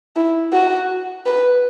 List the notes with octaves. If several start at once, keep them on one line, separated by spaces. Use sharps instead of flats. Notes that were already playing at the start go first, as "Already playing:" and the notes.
E4
F#4
B4